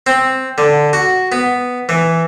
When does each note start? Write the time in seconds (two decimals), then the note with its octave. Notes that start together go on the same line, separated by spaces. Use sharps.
0.07 C4
0.58 D3
0.93 F#4
1.32 B3
1.89 E3